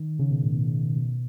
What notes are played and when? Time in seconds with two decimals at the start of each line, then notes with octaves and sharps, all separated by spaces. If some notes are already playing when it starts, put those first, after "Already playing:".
Already playing: D#3
0.19 C#3
0.31 B2
0.43 A2
0.55 B2
0.96 B2